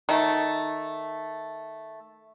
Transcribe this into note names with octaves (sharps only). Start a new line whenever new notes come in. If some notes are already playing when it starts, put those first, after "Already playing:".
D#3 A3